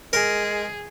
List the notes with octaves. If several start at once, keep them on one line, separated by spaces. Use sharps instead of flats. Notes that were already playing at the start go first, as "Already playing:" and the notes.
G#3 G#4 A#4